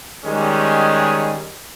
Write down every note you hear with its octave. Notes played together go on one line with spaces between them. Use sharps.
D#3 G3 G#3 C#4 G#4